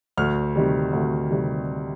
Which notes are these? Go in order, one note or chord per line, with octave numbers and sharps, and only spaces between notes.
D2 F6
C3 D#3 G3
D2
C3 D#3 G3